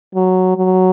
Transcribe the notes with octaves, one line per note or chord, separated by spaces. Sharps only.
F#3
F#3